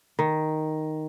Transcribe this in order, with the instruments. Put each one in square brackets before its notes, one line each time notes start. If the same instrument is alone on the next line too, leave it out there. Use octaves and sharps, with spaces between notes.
[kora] D#3